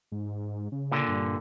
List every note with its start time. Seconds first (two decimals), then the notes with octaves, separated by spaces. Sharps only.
0.12 G#2
0.72 C#3
0.92 A#2 D3
1.08 G2